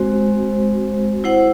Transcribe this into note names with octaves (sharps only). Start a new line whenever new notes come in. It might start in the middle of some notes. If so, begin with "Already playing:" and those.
Already playing: G#3 C4 F#4 C5
E4 C5 F#5